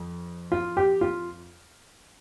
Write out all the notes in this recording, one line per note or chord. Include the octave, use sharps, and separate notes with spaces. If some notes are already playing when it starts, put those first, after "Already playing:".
Already playing: F2
F4
G4
F4